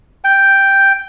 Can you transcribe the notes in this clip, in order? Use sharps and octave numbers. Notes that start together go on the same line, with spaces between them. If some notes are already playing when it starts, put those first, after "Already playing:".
G5